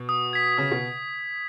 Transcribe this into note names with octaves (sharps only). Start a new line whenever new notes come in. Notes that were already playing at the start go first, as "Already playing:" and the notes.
Already playing: B2
D#6
G#6 B6
C#3 D#6
B2